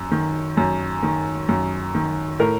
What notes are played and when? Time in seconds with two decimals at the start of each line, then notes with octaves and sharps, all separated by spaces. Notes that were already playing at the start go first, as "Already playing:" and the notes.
Already playing: F#2
0.11 D#3
0.57 F#2
1.03 D#3
1.49 F#2
1.94 D#3
2.40 A2 A#4